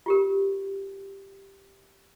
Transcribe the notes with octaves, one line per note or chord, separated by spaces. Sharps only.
F4 G4 A#4